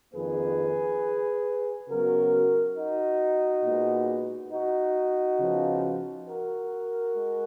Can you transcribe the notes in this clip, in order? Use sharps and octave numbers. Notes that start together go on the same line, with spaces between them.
F2 D#3 A#3 G#4 B4
C#3 F#3 B3 F#4 A#4
D#4 F#4
A#2 G#3 B3
D#4 F#4
C#3 F3 B3
F#4 A#4
G#3